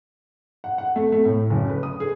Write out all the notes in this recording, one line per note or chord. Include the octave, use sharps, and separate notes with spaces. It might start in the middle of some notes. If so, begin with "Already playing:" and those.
F#5
F#5
A3
A3
A2
F#1
B4
D#6
G#4